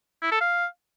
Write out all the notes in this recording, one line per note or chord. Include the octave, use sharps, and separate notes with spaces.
E4
A4
F5